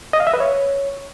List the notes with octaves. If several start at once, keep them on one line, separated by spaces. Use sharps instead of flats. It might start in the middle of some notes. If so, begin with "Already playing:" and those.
D#5
F5
E5
B4
C#5